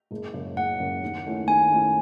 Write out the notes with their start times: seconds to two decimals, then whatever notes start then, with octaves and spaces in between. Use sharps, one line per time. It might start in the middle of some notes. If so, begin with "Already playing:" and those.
0.11 F#1
0.34 F#2 C#3
0.56 F#1 F#5
0.79 F#2 C#3
1.03 D#2
1.25 D#3 A3 C#4 E4
1.47 D#2 G#5
1.70 D#3 A3 C#4 E4